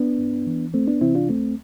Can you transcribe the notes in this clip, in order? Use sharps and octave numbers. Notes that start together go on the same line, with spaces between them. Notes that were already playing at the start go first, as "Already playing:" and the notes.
Already playing: B3 D4
G2
E3
D2 A3 C4
B3 D4
C3 E3 C4 E4
D4 F4
D2 A3 C4